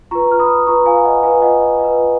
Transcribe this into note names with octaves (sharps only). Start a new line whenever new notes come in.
F4 B4 A#5 C#6
F6
B5 D#6
F4 B4 A#5 C#6
F5 G#5
F5
D#5 F#5
F4 B4 F5 G#5
D#5 F#5
D#5 F#5
F4 B4 D#5